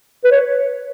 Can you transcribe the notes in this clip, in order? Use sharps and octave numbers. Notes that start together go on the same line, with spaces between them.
B4
C#5